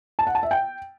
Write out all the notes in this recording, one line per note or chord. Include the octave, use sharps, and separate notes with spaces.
A5
F#5
A5
E5
G5